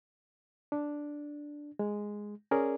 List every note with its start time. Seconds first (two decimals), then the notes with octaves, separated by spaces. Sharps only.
0.72 D4
1.79 G#3
2.51 C#4 G#4 A#4 D5